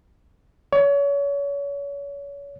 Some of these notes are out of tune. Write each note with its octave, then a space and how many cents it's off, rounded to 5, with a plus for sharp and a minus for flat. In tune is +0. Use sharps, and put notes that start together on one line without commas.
C#5 +30